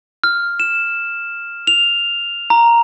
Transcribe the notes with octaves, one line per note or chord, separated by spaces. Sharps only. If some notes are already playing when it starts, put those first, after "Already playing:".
F6
E7
F7
A#5